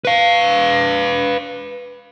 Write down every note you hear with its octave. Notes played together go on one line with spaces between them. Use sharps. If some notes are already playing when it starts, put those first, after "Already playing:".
B4 F5